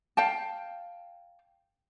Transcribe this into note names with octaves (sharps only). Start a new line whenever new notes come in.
F5 G5 A5